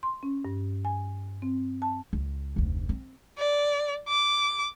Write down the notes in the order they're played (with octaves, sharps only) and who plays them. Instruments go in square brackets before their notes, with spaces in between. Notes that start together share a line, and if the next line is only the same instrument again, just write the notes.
[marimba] C6
C#4
G2
G#5
C4
A5
[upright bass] C#2
F1 D2
C4
[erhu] D5
D6